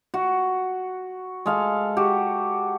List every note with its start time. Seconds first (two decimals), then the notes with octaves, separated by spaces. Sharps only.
0.14 F#4
1.46 G#3 A4 F5
1.97 F#4 G4